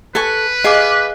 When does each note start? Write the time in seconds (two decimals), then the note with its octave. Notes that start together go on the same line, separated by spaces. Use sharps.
0.15 A4 B4 G#5 C#6
0.64 G#4 D#5 F5 D6